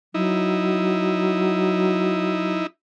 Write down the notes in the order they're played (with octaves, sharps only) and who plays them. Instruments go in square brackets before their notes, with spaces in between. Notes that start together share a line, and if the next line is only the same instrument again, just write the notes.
[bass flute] F#3 [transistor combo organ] D#4 E4